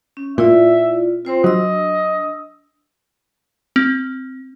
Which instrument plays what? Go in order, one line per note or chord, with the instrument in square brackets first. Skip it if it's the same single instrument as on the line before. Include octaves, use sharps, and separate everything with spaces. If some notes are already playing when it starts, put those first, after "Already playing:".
[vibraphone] C#4
[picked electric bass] A#2 [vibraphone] E4 F4 D5 [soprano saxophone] E5
[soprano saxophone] C4 [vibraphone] F4 C5 C6
[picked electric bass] F#3 [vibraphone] D4 E6 [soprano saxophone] D#5
[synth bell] C4